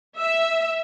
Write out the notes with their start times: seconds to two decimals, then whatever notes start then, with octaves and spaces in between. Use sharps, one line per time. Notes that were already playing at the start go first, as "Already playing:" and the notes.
0.17 E5